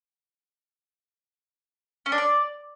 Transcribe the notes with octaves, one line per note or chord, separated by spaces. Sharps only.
C#4
D4
D5